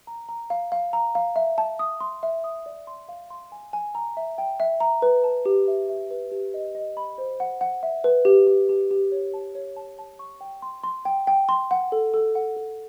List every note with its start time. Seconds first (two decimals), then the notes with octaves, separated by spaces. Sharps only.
0.07 A#5
0.29 A#5
0.50 F5
0.72 F5
0.93 A#5
1.15 F5
1.36 E5
1.58 A5
1.79 D#6
2.00 C6
2.23 E5
2.44 D#6
2.66 D5
2.87 C6
3.09 F5
3.30 C6
3.52 G#5
3.73 G#5
3.95 A#5
4.17 E5
4.38 G5
4.60 E5
4.80 A#5
5.02 B4
5.24 A5
5.46 G4
5.68 E5
5.89 E5
6.11 B4
6.32 G4
6.54 D#5
6.75 D#5
6.97 B5
7.18 C5
7.40 F#5
7.61 F#5
7.83 E5
8.04 B4
8.25 G4
8.47 G4
8.69 G4
8.91 G4
9.12 C#5
9.34 A5
9.55 C#5
9.76 A5
9.99 A5
10.19 C#6
10.41 G5
10.62 C6
10.84 C6
11.05 G5
11.27 G5
11.49 C6
11.71 F#5
11.92 A4
12.14 A4
12.35 F#5
12.57 A4